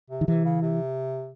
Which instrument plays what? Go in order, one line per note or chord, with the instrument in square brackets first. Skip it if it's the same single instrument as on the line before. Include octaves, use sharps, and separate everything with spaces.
[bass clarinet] C3
[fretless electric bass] D#3
[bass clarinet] C3 [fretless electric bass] E3
[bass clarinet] C#3
C3